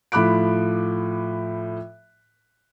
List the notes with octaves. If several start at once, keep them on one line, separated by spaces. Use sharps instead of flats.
A2 F3 B5 D6 F#6 D7